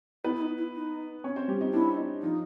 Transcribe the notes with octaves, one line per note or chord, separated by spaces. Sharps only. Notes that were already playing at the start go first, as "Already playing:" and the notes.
B3 E4 B4
E4
D#4
E4
D#4
C#4 C#5
C4 C5
G3 G4
D#4
D4 E4
D#4
F3 D#4 F4